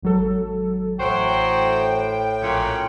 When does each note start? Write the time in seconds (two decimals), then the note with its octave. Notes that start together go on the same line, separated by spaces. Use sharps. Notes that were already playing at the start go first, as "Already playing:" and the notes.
0.02 G#1 F#3 A4
0.99 A1 A2 F#3 F#4 C5 G5
2.42 A#1 A#2 F#3 C#4